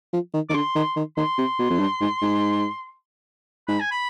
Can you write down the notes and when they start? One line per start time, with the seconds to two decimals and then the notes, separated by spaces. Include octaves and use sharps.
0.13 F3
0.34 D#3
0.50 D#3 D6
0.54 D3 C6
0.76 D#3
0.96 D#3
1.17 D#3 C6
1.38 C3
1.59 B2
1.70 F2
1.79 G2
2.01 G#2
2.22 G#2
3.68 G#2 B5
3.80 G#5
3.91 B5